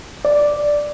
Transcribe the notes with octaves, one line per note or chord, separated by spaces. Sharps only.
D5